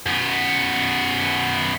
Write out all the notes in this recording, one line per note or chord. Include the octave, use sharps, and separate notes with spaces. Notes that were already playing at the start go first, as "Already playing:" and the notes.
F#2 B3